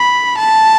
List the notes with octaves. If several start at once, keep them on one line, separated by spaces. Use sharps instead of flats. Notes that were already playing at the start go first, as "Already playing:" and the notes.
Already playing: B5
A5